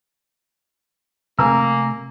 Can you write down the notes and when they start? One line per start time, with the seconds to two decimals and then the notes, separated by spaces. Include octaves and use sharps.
1.39 C3 A3 A#3 G#5 A#5 E6